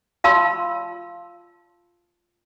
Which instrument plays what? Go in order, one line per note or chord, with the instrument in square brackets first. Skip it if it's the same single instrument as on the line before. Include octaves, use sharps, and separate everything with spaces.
[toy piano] F4 F5 A5 B5 C6 E6